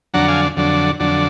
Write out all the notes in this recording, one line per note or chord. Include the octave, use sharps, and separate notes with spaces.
F2 D3 F#3 D4 F#5 A#5
F5 G#5
F2 D3 F#3 D4
F2 D3 F#3 D4